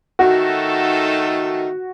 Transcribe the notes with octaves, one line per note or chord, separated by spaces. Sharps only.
D#3 A3 D#4 F#4 A4